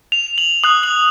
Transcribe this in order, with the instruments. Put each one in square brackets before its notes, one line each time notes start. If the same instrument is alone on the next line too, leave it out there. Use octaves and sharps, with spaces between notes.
[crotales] F7
F#7
D#6 F#6 F#7
F#7